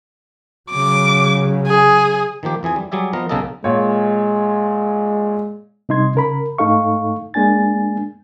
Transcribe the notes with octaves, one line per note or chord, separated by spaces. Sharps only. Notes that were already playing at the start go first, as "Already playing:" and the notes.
C#3 F#3 D6
G#4
D#3 F3 A#3 G4
F2 E3 G#4 G#5
G3
F#3 G3 G#4 D5 E5
F3 B3 A#4 D#5
B1 C#3 A#3 A4 A#4 D#5
A#2 G#3 C#5
C3 G3 D#4 D#5 C6 G#6
C#3 A#4 B5
G#2 A3 D#4 A4 F5 C#6
G#3 A#3 D4 G#5 A6